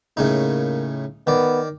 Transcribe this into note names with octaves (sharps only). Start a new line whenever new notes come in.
A2 C#3 A#3 D#4
D#3 B3 D5